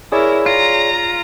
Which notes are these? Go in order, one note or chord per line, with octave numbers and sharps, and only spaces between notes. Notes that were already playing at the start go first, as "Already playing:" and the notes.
E4 G#4 A#4 C#5 D5
F4 A#5